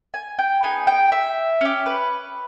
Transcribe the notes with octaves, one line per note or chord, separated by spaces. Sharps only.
G#5
G5
B3 D#4 G#4 G#5
G5
E5
C#4 G4
B4